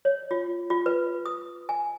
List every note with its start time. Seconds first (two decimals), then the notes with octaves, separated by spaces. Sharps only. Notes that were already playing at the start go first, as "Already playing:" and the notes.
0.05 C#5
0.31 F4
0.70 F4
0.86 B4
1.26 D#6
1.69 G#5